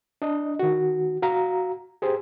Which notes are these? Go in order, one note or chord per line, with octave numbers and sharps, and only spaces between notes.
D4 D#5
D#3 F#4
F#4 F5 A#5
G4 G#4 C5